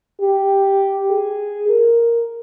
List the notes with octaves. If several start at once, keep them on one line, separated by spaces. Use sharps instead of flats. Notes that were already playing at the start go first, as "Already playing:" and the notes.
G4
G#4
A#4